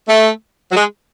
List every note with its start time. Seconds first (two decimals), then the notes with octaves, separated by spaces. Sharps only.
0.08 A3
0.71 F#3
0.75 G#3